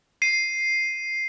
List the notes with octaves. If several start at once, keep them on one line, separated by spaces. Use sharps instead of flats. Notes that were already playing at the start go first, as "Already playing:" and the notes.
C7 D#7